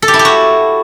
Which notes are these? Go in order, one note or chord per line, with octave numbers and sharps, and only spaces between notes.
A4
G4
E4
G4
F#4